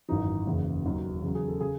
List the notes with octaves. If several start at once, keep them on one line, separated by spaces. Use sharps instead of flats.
G#1 F#2 E3 D#4
F#1 E2 C#3
E1 D#2 D#3 F#3
E2 C#3 F#3
G#4
A4
C#3 G#4